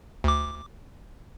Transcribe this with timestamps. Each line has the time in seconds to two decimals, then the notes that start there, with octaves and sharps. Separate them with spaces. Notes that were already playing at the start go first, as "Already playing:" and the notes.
0.24 D2 D6